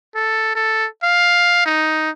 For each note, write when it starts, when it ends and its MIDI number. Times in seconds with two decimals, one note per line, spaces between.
0.15 0.54 69
0.55 0.86 69
1.03 1.63 77
1.66 2.10 63